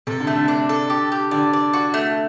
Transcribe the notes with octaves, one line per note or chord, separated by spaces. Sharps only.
C3 A4
D3
A3
D3
D4
A4
G4
G4
D3 D5
D5
F#4
A3